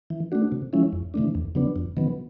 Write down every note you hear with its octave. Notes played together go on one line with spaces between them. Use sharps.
E3
A3 D4 F#4
C3
F3 G#3 C#4 E4
F2
C3 E3 A3 D4
E2
C#3 F#3 B3 D4
F2
C3 D#3 F#3 B3